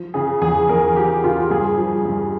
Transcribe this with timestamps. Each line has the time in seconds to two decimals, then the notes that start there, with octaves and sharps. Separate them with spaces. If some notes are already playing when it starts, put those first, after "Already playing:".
Already playing: F3
0.14 C#3 G#4
0.41 E2 G#4
0.69 E2 A#4
0.96 F3 G4
1.24 C#3 F4
1.50 G2 G#4
1.77 F3
2.05 G2